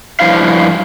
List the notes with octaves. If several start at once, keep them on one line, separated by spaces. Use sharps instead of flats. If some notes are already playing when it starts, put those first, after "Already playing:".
G2 F3 E4 F5